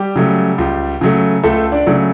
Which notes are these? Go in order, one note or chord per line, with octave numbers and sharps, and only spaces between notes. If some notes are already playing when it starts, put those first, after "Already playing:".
Already playing: G3 G4
C#3 F#3 A3
C#2
C#3 F#3 A3
C#2 A3 A4
D4 D5
C#3 F#3 A3